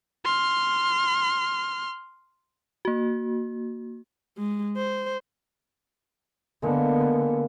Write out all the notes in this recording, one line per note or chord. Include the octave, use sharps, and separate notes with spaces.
C6 F6
A#3 F#4
G#3
C5
D3 G#3 A#3 B3